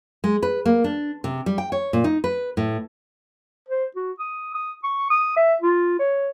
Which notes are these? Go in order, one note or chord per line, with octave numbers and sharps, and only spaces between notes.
G#3
B4
A#3
D4
C3
G3
G5
C#5
A#2
D#4
B4
A2
C5
F#4
D#6
D#6
C#6
D#6
E5
F4
C#5